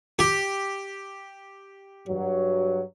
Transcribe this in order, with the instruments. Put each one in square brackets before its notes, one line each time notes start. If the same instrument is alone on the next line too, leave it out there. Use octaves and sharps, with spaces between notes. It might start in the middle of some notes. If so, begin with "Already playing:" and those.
[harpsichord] G4
[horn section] G2 F#3